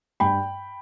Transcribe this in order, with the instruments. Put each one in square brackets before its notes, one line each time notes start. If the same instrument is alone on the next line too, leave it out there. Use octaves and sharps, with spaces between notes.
[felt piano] G2 G5 B5